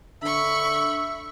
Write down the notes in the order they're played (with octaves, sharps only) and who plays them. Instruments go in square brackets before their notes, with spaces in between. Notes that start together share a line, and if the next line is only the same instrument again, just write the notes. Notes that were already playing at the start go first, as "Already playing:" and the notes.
[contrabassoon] D3 [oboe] E5 [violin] B5 C#6